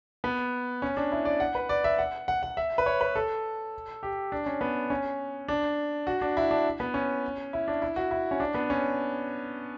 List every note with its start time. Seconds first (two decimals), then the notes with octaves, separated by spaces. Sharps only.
0.24 B3
0.82 C#4
0.97 D4
1.12 E4
1.25 D5
1.40 F#5
1.55 B4
1.69 D5
1.84 E5
1.99 F#5
2.28 F#5
2.43 F#5
2.57 E5
2.78 B4
2.86 C#5
3.01 B4
3.16 A4
4.03 G4
4.32 D4
4.46 C#4
4.61 B3
4.90 C#4
5.48 D4
6.07 F#4
6.22 D4
6.37 E4
6.51 D4
6.80 B3
6.94 C#4
7.53 E4
7.68 D4
7.82 E4
7.96 F#4
8.11 E4
8.31 C#4
8.40 D4
8.54 B3
8.70 C#4